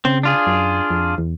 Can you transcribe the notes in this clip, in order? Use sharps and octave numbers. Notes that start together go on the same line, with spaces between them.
C#3 C4
D4 F4 G#4
F#2
F2
E2